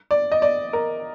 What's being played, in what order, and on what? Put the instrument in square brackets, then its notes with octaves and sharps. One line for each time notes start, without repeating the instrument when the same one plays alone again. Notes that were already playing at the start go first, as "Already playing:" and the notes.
[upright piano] D5
D#5
D5
A#4